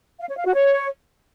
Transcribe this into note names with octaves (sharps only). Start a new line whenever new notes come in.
F5
C#5
F5
F#4
C#5